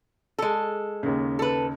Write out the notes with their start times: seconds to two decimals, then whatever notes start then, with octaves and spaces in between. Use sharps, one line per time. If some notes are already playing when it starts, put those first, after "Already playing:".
0.39 G#3 A4
1.03 D#2 C#3
1.39 A4 B4